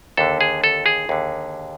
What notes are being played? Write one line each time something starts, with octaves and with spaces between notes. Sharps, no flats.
D#2 D3 A4
G#4
A4
G#4
D#2 D3